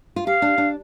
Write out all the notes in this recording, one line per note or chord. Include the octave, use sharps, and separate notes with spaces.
F4
G4 F5
D4
D4